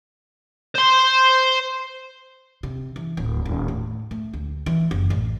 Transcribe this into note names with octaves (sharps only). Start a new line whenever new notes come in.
C5 C6
C3
E3
D1
D#1
A2
A3
D2
E3
F#1
A1